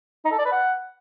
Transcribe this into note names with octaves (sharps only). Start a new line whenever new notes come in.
D#4
A4
D5
B4
F#5